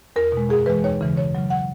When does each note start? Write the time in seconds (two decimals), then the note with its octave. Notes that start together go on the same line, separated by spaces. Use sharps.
0.16 E2 A#4
0.32 B2 G#3
0.49 F#2 G#4
0.66 E3 G#3 B4
0.84 D#2 C#5
1.01 C#3 E3 G#3
1.17 F#2 C#5
1.35 C#3 F#3
1.50 F#5